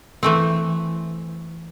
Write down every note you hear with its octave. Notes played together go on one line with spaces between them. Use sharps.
E3 A3 C4